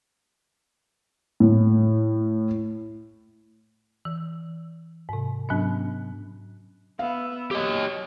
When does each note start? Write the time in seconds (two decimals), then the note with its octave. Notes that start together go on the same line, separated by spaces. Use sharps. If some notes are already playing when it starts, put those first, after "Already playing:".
1.40 A2
4.05 E3
5.09 G#2 C3
5.49 G#2 F#3 B3 C#4 D4
6.99 B3 E5 F5
7.51 F#3 G4 D#5